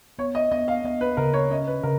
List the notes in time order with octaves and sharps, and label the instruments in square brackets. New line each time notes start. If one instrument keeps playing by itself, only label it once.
[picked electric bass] B3 [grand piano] C#5
[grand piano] D#5
[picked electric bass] B3 [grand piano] D#5
[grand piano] F5
[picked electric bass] B3 [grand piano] D#5
[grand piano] B4
[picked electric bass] C#3 [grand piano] A#4
[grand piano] C#5
[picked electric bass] C#4 [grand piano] D#5
[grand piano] B4
[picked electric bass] C#3 [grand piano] A#4